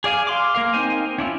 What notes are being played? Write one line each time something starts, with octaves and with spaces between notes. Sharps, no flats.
G#4 D5 F5 G#5
F5 C6 D6
A#3 A#4 F5
C4 D#4 A#4 C5 G#5
C#4 D4 E4 F4